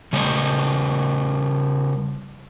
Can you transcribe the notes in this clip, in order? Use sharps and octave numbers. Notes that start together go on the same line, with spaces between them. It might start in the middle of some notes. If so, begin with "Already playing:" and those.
C#3 G3 C#5